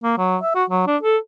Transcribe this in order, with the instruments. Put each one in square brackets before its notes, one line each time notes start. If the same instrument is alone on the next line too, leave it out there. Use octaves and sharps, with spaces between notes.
[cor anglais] A#3
F#3
E5
F#4
F#3
D4
A4